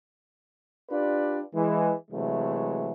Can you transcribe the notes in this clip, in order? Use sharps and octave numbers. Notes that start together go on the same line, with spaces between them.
D4 F4 G4 B4 D5
E3 G#3
C3 E3 F#3 G#3 A3